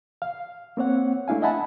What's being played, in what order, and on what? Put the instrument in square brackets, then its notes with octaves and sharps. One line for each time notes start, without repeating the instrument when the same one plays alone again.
[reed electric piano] F5
A#3 C4 C#5 F#5
A3 D4 E4 F5 G#5
D#5 E5 F#5 G#5 A5 B5